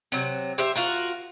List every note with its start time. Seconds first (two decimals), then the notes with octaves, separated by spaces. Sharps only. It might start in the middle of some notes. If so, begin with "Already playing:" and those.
0.12 C3 F#3
0.58 G4 C5 E5
0.76 F4 F#4 A#4